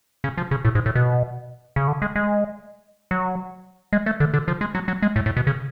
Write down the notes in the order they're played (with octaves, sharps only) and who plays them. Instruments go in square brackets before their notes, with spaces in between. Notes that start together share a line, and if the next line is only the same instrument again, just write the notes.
[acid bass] C#3
F3
C#3
A2
G#2
A2
B2
C#3
D3
G#3
G#3
F#3
G#3
A3
D3
D3
F3
G#3
F#3
F#3
G#3
A2
A2
B2
C#3